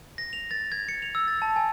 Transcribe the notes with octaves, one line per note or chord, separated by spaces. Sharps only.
A#6
F7
A6
G#6
C#7
F7
E6
A6
A5
G#5